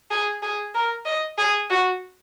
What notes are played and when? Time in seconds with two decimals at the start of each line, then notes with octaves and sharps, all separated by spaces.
0.11 G#4
0.43 G#4
0.75 A#4
1.06 D#5
1.38 G#4
1.70 F#4